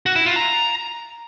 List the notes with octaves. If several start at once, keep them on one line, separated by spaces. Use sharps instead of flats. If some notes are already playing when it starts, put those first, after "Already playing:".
F#4
E4
F4
A#5